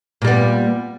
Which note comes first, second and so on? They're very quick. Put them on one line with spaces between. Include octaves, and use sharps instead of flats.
A#2 G3 B3